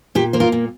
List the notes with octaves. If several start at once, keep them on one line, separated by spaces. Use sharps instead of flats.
A#2 G4
A#3 C5
F4 A#4
A#2